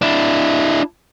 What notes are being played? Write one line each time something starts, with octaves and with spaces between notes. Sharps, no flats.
D4 E4